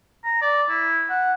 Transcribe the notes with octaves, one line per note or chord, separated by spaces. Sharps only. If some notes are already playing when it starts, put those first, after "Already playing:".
A#5
D5
E4
F#5